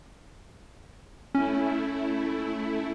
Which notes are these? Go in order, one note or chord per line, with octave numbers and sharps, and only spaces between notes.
A3 C#4 E4